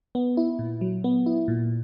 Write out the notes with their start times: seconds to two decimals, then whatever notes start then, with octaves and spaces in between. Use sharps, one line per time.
0.15 B3
0.37 E4
0.59 A#2
0.81 F#3
1.04 B3
1.26 E4
1.48 A#2